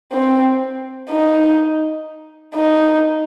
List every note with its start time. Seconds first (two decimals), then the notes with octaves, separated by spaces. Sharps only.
0.13 C4
1.10 D#4
2.54 D#4